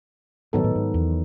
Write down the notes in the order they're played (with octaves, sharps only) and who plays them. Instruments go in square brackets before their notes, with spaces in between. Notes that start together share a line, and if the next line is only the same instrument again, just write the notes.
[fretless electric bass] G#2 [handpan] D#3 F#3 B3 D#4 A4
[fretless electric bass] A2
G#2
E2